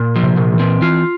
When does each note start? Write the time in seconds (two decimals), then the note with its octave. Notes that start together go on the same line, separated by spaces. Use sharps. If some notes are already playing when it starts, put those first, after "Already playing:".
Already playing: A#2
0.16 F3
0.23 C3
0.37 A#2
0.53 E3
0.59 C4
0.81 E3 F4